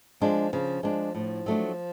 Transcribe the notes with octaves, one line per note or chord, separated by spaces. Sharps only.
F3 G#3 D4
C#3 F3
F3 G#3 D4
A2 F3
F#3 A3 D4